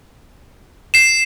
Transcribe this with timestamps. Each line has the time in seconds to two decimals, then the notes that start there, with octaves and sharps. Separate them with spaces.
0.94 C7 E7